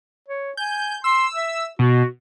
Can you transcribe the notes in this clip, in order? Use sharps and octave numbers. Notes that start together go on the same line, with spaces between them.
C#5
G#5 G6
C6 E6
E5
B2 F#4